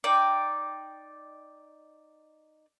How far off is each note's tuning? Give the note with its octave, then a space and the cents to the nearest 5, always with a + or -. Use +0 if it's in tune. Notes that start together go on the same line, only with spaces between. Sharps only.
D#4 -10 D5 +0 G5 +0